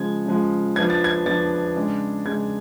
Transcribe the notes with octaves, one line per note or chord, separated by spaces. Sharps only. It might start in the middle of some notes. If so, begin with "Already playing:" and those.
Already playing: C#3 F3 G#3 G#6
C#3 F3 G#3
F3 B3 D4 G#6
A6
G#6
F3 B3 D4 A6
C#3 G#3 D4
C#3 G#3 D4 G#6